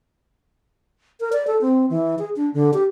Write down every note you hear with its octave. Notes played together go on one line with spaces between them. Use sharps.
A#4
D5
A4
C4
E3
G#4
D4
D3
G4